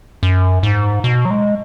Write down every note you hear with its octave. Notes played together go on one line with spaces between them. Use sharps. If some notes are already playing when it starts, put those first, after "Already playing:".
F#2
G#2
B2
F#3
G#3